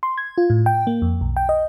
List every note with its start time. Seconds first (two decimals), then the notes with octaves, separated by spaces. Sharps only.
0.03 C6
0.18 G#6
0.38 F4
0.50 A2
0.66 G5
0.87 A#3
1.02 F2
1.21 B1
1.37 G5
1.49 D#5